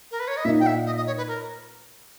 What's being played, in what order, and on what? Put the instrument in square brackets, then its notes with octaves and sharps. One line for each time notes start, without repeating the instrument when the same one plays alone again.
[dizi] A#4
B4
C#5
D#5
[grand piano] A#2 A#3 D#4 [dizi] E5
[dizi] G5
E5
D#5
D#5
C#5
B4
A#4